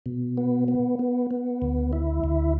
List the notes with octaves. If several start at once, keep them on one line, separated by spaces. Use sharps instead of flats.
B2
B3
B3
B3
B3
D2
E4
D2